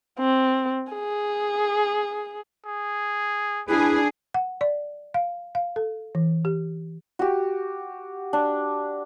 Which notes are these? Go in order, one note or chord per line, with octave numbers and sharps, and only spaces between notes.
C4
G#4
G#4
D4 E4 G#4 B4
F#5
D5
F5
F5
A4
E3
G4
F#4 G4
D4